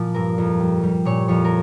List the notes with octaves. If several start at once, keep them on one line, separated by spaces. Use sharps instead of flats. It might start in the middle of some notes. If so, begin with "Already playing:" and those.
Already playing: A#2 F3
G2 A#4
F2
G3
G3
A#2 C#5
F2 C#5
A#4